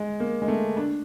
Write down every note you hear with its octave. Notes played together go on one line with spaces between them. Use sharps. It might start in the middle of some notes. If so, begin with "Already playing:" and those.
Already playing: G#3
A#3
G#3
A3
D4